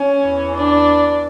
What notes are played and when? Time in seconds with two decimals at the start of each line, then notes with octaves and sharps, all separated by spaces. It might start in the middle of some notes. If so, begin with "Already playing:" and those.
Already playing: C#4
0.24 E2 E3
0.55 D4